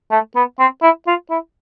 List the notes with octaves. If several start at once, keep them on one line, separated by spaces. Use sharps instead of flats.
A3
B3
C4
E4
F4
E4